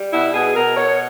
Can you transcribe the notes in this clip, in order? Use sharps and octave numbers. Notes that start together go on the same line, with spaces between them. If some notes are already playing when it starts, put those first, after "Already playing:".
Already playing: G3
B2 E4
B2 G#4
B2 A#4
B2 C#5